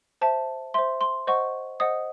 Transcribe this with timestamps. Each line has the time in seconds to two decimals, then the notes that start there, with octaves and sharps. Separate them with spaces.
0.21 C5 E5 A5
0.74 C5 E5 C6
1.01 C6
1.27 C5 D#5 F#5 C#6
1.80 C5 D#5 F#5 D#6